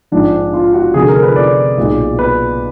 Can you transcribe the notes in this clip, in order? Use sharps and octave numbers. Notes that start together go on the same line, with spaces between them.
A#1 G#2 F3 G#3 D4
F4
F#4
F1 F2 D3 G#4
A#4
B4
D5
B1 A#2 G#3
B4